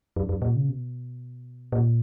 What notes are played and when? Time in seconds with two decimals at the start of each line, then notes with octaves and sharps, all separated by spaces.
0.16 F#2
0.29 F#2
0.42 A#2
0.56 C#3
0.69 B2
1.72 A#2